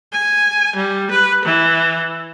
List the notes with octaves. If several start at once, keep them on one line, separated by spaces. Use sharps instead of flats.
G#5
G3
B4
E3